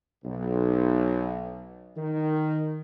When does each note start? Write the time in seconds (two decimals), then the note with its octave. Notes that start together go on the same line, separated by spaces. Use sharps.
0.24 B1
1.97 D#3